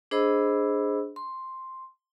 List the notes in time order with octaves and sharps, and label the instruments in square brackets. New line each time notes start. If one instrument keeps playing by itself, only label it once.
[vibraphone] D4 G#4 C5 D#5 B5 E6
C6